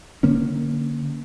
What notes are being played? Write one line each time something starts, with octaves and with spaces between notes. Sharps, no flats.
D3 A#3 C#4